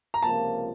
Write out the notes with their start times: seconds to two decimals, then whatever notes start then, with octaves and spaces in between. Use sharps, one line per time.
0.14 A#5
0.22 C#2 C3 F3 A#3 A5